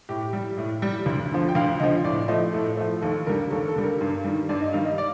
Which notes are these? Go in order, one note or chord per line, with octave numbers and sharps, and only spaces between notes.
A2 G4
G3
A2
G3
D2
D3 F3
G5
D2 F5
D3 F3 D#5
A2 D5
F3 A3 D#5
A2 A4
F3 A3
D#2 A4
D3 G3 A#4
D#2 A4
A4
D3 G3
A#4
G2
D#3 G3
G2 D5
D#5
D#3 G3 F5
D#5
D5